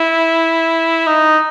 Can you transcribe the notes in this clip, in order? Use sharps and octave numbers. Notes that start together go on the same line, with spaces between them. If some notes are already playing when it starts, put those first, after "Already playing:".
Already playing: E4
D#4